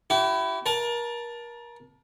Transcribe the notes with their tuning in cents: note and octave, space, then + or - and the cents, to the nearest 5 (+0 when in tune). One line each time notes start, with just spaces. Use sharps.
E4 +10 G4 -45
A#4 +30 A5 +0